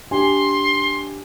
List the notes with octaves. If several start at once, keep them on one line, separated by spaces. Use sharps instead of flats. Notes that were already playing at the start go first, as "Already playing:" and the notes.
D4 G4 G#5 C6